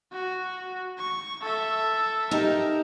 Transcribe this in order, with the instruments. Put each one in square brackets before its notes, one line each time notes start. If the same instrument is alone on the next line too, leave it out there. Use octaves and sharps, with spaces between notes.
[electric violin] F#4
C#6
A4 E5
[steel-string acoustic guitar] D#4 G4 A4 [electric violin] A#4